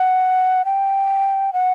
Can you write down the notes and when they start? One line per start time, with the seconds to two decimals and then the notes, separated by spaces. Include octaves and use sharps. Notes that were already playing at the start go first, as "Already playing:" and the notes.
Already playing: F#5
0.65 G5
1.53 F#5